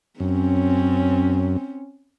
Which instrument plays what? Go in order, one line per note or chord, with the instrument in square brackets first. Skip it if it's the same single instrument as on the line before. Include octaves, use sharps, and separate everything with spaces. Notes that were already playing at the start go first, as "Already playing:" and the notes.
[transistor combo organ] F#2 [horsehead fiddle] C4 C#4